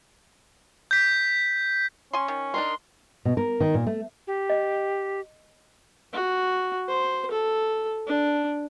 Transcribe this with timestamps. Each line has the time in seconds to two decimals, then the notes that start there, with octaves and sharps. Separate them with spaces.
0.91 G6 B6
2.13 C#4 G#5 C6
2.28 D#3
2.54 D4 D#4 A#4 C6
3.25 B2
3.37 A#4
3.60 D#3
3.74 A#2
3.86 A3
4.27 G4
4.50 D#5
6.13 F#4
6.88 C5
7.31 A4
8.07 D4